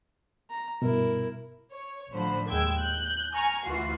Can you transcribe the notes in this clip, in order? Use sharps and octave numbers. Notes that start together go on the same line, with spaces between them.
A#5
G2 B2 E4 A#4
C#5
A1 D3 F3 C5 B5
D#2 G#3 G5 E6 G#6
F#6 G6
G#5 A#5 C#6 F6
D2 E3 F4 F#4 C7